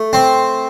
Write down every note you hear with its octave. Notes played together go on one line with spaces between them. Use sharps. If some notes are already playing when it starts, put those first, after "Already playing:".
Already playing: A3
C4